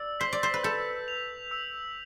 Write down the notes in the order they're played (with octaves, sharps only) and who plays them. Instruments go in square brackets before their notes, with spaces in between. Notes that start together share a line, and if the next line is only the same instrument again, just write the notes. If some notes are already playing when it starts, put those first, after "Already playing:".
Already playing: [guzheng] D5 [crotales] E6
[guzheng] C5 [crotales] B6
[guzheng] D5
C5
B4
[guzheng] A4 [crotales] G6
[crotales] F7
E6